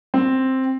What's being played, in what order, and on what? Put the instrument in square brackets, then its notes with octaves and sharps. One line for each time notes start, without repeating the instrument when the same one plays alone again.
[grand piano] C4